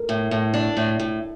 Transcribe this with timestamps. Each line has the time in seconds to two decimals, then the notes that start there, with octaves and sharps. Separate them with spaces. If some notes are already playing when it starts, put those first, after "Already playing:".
Already playing: A4 A#4
0.09 A2
0.31 A2
0.54 D4
0.77 A2
0.99 A2